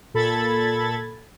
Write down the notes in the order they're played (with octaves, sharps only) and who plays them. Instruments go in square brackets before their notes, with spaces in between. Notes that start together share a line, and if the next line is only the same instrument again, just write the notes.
[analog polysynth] A#2 A4 B5 G#6 A6